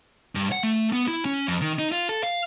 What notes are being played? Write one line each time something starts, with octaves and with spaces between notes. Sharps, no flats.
G2
F#5
A3
B3
E4
C#4
F2
D#3
D#4
F4
A4
F5